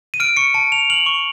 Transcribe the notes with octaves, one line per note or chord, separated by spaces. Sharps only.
D#7
F6 D7
C#6 C#7
A5 D7
A5 F7
F6 F#7
C#6